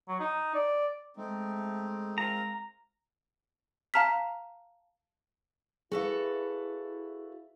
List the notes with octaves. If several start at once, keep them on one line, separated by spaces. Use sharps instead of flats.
F#3
D#4
D5
G#3 A3 C4 D#4
C4 F4 A#4 A#5
F5 A5 A#5 F6 B6
E4 F#4 G#4 A4 B4 F5